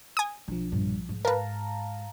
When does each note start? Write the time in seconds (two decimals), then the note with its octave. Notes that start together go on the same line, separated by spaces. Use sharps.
0.17 G#5 D#6
0.48 B1 F3 D4
0.72 A#1 G2
1.09 G#2
1.25 A#4 B4 F5 A5 A#5